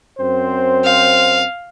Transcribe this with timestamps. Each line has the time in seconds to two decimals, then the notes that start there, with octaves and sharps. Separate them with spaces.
0.19 F#2 C4 C5
0.85 F5